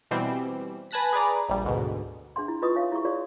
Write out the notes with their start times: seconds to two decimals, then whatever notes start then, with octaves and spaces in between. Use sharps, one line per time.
0.11 B2 E3 G3 C4
0.91 B4 G#5 A5 F#6 A#6 B6
1.13 G#4 B4 D5 A#5
1.49 A#1 G3
1.64 D2 G#2 B2
2.36 D4 G#4 E5 F#5 C6
2.48 E4
2.62 F4 B4 D#5 C#6 D#6
2.76 D#4 C#5 E5 F5
2.92 E4 G4 G#4 E5 C#6
3.05 F#4 G#4 C#5 D5 F5